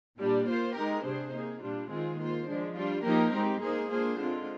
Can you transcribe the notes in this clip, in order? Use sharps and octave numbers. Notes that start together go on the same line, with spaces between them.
A#2 G3 D4
A#3 F4 C5
G#3 D#4 G4 A#4
C3 G3 D4 G#4 C5
A#3 D#4 G#4
A#2 G3 D4 F4
D#3 G#3 C4 F4 G#4
A#3 F4 C5
F3 G#3 D4
G3 D4 F4
F3 A#3 D#4 G4 A#4
G#3 C4 D#4 G4
A#3 D#4 G#4 C5
A#3 D4 F4 G#4 C5
D3 G#3 C4 F4